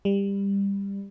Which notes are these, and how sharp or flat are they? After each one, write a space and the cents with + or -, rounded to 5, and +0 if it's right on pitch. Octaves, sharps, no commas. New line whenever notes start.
G3 +20